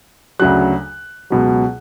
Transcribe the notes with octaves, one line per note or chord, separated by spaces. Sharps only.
D2 C#3 F#3 F#6
C#2 B2 F#3